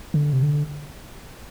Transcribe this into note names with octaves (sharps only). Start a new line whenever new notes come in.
D3
C3
D3